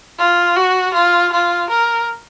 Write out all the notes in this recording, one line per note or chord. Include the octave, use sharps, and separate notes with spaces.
F4
F#4
F4
F4
A#4